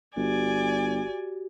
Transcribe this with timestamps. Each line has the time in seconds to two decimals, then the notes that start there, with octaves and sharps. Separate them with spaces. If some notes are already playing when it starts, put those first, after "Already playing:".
0.16 G1 F#4 G4 D5 G#5